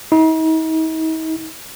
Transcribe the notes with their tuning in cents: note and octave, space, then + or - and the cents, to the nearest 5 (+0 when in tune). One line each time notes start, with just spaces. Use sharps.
D#4 +45